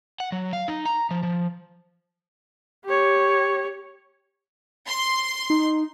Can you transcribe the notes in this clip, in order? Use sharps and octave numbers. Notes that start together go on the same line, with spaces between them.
F#5
F#3
F5
D#4
A#5
F3
F3
G4 C#5
C6
D#4